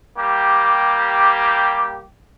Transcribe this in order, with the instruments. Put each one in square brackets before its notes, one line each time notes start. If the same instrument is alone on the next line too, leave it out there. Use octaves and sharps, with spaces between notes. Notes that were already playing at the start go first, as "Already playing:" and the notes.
[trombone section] G3 A#3 G4